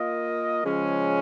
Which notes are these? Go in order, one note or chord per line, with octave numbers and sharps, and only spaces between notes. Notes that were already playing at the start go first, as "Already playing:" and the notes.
Already playing: A#3 F4 A#4 D#5
C#3 F3 G#3 C#4